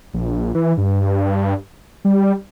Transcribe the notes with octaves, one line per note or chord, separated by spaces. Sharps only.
A#1
E3
G2
G3